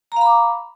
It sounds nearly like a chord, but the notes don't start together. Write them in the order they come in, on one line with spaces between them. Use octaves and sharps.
A#5 F5 B5 D6